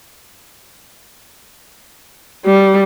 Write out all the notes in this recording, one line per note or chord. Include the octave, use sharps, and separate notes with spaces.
G3